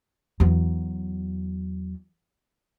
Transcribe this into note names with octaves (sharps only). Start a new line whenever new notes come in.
E2 F#3